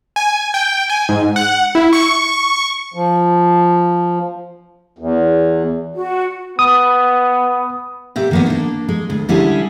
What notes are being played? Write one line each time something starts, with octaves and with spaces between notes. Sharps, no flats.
G#5
G5
G#5
G#2
F#5
E4
C#6
F3
E2
F#4
B3 D#6
A#2 G4 E5
D#3 A#3 B3
A#3 D4
G#3
D2
D3 G3 C#4 E4 G#4